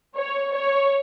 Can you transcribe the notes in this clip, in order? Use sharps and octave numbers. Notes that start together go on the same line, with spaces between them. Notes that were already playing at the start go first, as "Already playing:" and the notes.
C#5
C#5